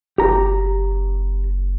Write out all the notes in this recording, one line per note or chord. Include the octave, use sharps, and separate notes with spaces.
F#1 G4 A#5